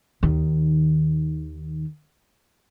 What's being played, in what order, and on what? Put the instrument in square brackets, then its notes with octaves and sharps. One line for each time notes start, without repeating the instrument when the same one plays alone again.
[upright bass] D#2 D#3